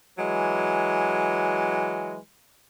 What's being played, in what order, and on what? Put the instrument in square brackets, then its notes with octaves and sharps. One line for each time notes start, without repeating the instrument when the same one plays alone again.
[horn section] E3 F#3 G#3